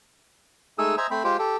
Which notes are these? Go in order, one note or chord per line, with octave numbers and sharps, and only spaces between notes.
G#3 A3 D#4 G#4 D#6 E6
C5 D#5 E5 G#5 A#5
A3 C4 C5 B5
G#3 F4 G4 C5
G4 A4